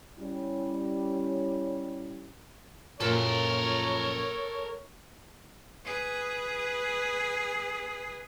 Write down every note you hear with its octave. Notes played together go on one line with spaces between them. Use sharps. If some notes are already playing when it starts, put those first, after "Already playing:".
G3 C#4 E4
F#2 A#2 F3 A4 A#4 C#5
G#4 B4